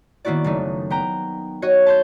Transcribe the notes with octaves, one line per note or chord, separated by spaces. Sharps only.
D#3 A#3 B3 E4 F#4 D5
F#1 A3 D#4
B3 G5 A#5
F#4 C#5 D#5
A5 C6 G6